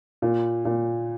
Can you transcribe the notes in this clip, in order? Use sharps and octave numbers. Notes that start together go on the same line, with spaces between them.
A#2
A#2